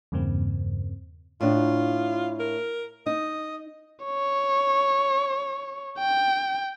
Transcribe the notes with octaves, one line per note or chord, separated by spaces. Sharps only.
E2 G2 C#3 A#3 C4
A2 D4 F4
A#4
D#4 D#5
C#5
G5